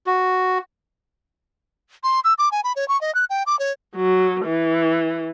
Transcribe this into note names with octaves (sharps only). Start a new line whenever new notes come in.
F#4
C6
E6
D6
G#5
B5
C#5
C#6
D#5
F#6
G5
D6
C#5
F#3
E3